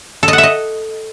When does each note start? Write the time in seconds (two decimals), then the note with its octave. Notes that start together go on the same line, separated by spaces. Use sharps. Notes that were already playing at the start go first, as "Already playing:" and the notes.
0.23 A4
0.28 D#5
0.33 F#5
0.38 E5
0.43 D#5